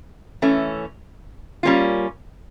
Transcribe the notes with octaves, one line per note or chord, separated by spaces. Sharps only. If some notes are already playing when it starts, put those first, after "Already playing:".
E3 A3 C#4
G3 A#3 C#4 F4